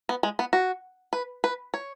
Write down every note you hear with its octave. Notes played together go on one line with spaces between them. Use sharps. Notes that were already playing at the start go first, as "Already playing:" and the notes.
B3
G#3
B3
F#4
B4
B4
C#5